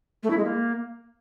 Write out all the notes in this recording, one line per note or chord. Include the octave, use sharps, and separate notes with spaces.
A3
E4
G#3
A#3